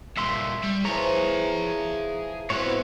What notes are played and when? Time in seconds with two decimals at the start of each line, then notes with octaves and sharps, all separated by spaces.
0.17 G2 A#2 E5 C6 C#6
0.64 G3
0.85 E3 F3 G#4 C#5 E5 A#5
2.50 G#2 B3 C4 E4 F#4 B4 C#5